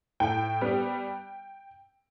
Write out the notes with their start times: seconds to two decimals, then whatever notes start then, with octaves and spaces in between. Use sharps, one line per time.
0.20 A2 G5
0.61 G3 B3